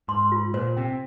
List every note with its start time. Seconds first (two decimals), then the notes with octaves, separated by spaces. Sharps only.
0.08 G#2 C6
0.32 F4
0.54 A#2 C5
0.77 C3 G5